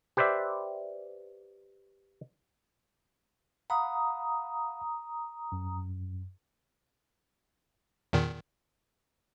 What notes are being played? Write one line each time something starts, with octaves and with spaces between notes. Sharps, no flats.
G4 B4 C5 D5 E5
F5 F#5 A#5 B5 D#6
F#2
E2 A#2 D#3